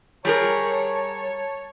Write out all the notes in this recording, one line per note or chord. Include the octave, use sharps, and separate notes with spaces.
G3 G#4 A#4 C#5 A5